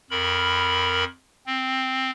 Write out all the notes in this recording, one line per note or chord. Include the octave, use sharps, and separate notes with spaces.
F2 A#4 B5
C4